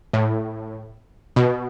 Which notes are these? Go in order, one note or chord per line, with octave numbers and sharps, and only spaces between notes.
A2
B2